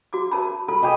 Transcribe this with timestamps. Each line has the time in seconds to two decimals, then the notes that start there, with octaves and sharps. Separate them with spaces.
0.13 F#4 D6
0.31 A#4 A5 B5
0.68 A4 B5
0.82 G4 G#4 D#5